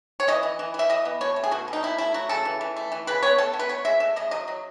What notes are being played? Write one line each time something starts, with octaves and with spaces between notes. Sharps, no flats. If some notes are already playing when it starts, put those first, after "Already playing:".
C#5
E3 D#5
E3
E3
E3
E5
E3 D#5
B3
B2 C#5
A3
G#4
B2 F#4
B2
D#4
B2 E4
A3 E4
F#3 F#4
C#3 A4
E3
E3
A3
E3
C#3 B4
B3 C#5
B3 A4
B3
B4
B3 C#5
G#3 E5
A3 E5
C#3 D#5
F#3 D#5
F#3